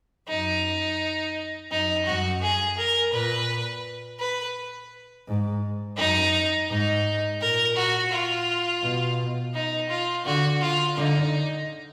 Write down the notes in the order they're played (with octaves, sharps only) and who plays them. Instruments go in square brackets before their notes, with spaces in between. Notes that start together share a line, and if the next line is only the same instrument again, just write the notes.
[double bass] F#2 [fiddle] D#4
[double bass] F#2 [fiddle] D#4
[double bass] F#2 [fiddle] F#4
[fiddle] G#4
A#4
[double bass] A#2 [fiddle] B4
[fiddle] B4
[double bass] G#2
[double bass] F#2 [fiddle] D#4
[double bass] G#2 [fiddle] D#4
[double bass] A#2 [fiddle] A#4
[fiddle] F#4
F4
[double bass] B2
[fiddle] D#4
F4
[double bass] D3 [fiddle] F#4
[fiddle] F4
[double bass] D3 [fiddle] D#4